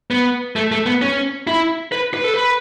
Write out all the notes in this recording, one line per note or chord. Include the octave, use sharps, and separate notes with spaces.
B3
A3
A3
B3
C#4
E4
B4
B4
A4
B4